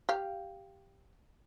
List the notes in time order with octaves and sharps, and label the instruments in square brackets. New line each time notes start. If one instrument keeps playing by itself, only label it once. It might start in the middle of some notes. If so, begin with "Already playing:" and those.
[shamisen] G4 F5